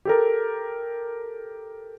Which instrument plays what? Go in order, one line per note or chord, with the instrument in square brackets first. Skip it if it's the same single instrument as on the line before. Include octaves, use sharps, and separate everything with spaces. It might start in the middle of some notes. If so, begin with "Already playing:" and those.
[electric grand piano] G4 A4 A#4